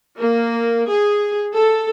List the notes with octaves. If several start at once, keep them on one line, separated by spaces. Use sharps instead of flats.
A#3
G#4
A4